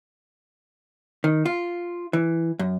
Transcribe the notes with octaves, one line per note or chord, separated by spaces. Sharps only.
D#3
F4
E3
F#2